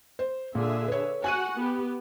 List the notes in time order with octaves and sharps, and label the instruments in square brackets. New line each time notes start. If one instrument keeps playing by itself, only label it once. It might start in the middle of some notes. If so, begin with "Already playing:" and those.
[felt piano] C5
[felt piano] A#2 [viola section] D3 G#4 E5
[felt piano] B4 C#5
[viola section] F#4 F#5 [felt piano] G#5 F#6 D#7
[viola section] B3 G4